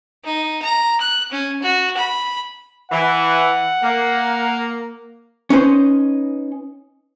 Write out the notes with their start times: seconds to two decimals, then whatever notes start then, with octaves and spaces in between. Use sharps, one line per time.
0.24 D#4
0.62 A#5
1.01 F#6
1.32 C#4
1.62 F#4
1.97 B5
2.92 E3 F#5
3.82 A#3
5.50 C#4 D#4 B4 C5